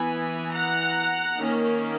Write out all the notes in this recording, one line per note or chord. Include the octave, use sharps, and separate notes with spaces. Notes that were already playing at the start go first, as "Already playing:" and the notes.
Already playing: E3 B3 G#5 B5
F#5 A#5
D#3 A#3 C#4